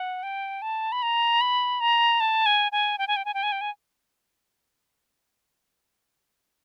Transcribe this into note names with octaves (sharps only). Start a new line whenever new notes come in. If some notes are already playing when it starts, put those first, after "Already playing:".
Already playing: F#5
G5
A5
B5
A#5
B5
A#5
A5
G#5
G#5
G5
G#5
G5
G#5
G5
G#5
G5
G#5